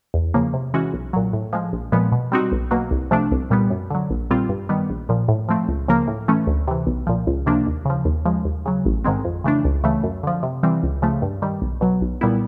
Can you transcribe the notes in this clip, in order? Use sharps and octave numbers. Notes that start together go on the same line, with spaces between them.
E2
C#3 F3 A#3
C3
E3 G#3 C#4 F#4
B1
A#2 F#3
A2
F3 G#3
A#1
A#2 F3 G#3 B3
B2
G3 C4 D#4 F#4
B1
B2 F#3 A#3
C2
C3 F3 A3 D4
C2
A#2 G3 B3
F#2
D3 F#3
A#1
A#2 G3 C4 F4
G2
D#3 G3 B3
A#1
A#2 F3
A2
F3 A3 C4
C#2
C#3 F3 A#3
A2
E3 A3 C#4
D2
C3 E3
B1
A#2 F3
C#2
C3 F3 A#3 D4
D#2
C#3 F3
D#2
C#3 F3 G#3
D#2
C#3 F#3
A1
G#2 D#3 G#3 C4
F2
C#3 E3 A3 D4
C#2
C#3 E3 A3
F#2
D3 F3
C3
E3 G3 C4
C#2
C#3 F3 A3
G2
D#3 G3
B1
B2 F#3
B1
A#2 G3 B3 E4